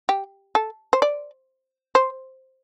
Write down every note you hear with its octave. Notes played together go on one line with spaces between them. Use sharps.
G4
A4
C5
D5
C5